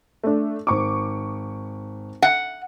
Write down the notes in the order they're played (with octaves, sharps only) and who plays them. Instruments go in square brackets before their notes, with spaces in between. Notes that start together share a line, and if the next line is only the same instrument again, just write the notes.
[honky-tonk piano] A3 D4
G#1 C#6 D6
[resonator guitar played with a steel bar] F#5